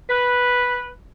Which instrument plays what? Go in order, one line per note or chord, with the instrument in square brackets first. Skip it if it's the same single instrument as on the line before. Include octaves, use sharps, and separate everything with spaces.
[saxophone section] B4